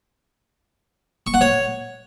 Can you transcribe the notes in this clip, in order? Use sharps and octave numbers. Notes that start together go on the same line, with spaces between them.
C#6
F#5
C#5